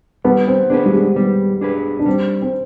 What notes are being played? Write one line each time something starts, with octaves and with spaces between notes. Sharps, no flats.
G3 B3
C4
B3 D4 G#4 B4
G3
G#3
G3 B3
D4 G#4 B4
D4
G3 C4
C4